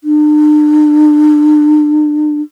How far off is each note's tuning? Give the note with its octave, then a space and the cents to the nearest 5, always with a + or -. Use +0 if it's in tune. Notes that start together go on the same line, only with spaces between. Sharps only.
D4 +40